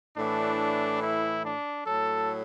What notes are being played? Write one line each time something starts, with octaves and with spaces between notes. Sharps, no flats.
A2 E3 D4
E4
D4
A2 F#3 A4